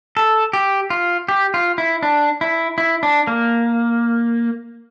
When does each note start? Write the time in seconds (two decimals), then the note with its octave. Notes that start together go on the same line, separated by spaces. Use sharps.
0.17 A4
0.53 G4
0.90 F4
1.29 G4
1.54 F4
1.78 E4
2.03 D4
2.41 E4
2.78 E4
3.03 D4
3.27 A#3